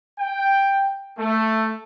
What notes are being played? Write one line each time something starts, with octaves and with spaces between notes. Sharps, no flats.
G5
A3